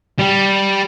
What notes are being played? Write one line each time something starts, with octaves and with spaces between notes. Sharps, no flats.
G3 G4